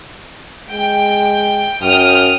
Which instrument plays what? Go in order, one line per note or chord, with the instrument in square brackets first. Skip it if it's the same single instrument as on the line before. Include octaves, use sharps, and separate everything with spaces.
[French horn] G#3 [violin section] G5
[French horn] F#2 [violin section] G5 D#6 F6